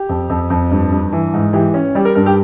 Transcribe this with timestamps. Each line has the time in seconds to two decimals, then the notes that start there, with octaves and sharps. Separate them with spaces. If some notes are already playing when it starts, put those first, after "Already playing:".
Already playing: G4
0.09 F2
0.29 F2
0.50 F2
0.71 G2
0.92 G2
1.12 E3
1.34 G#2
1.53 E3 G4
1.74 C#4
1.95 G3 G4
2.05 A#4
2.15 G2 A#4
2.26 G4